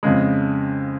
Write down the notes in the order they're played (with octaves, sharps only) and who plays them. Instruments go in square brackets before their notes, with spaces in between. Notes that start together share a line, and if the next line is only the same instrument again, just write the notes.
[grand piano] F2 C#3 G#3